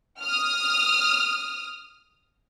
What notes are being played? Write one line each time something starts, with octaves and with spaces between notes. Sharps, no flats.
D#6 F6